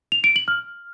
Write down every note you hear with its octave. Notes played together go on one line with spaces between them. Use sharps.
F7
D7
F#7
F6